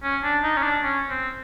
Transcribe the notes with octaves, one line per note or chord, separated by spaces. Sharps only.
C#4
D4
D#4
C#4
D4
C#4
C4